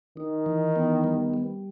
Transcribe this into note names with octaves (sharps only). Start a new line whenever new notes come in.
D#3 D#4
E3
B3
G3
G3